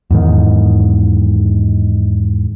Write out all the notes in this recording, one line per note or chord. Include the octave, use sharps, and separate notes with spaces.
E2 G#2 D#3